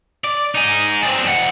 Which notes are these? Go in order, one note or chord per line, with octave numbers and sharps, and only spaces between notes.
D5
D#4 G#4
C4 D4
F2 F#5